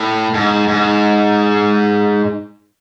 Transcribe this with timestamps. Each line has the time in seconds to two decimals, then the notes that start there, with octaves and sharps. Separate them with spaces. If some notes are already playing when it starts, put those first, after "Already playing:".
Already playing: A2
0.34 G#2
0.68 G#2